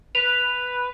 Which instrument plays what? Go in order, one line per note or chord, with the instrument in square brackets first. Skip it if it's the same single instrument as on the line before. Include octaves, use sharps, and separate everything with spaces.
[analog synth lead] B4 [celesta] F7